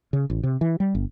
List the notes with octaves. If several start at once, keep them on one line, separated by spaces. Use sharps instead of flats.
C#3
A1
C3
E3
G3
G1